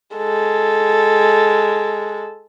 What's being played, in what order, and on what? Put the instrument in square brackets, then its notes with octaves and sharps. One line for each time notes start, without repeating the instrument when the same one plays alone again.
[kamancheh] G#3 A4